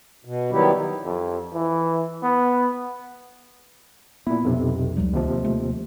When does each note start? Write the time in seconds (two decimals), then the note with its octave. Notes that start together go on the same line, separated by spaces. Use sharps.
0.25 B2
0.51 D#3 F#3 G3 B3 E4 G4
1.05 F2
1.54 E3
2.23 B3
4.27 A#2 B3 E4
4.44 B1 F2 C3
4.97 C#2 F#3 G3
5.13 D#2 C3 F3
5.44 A3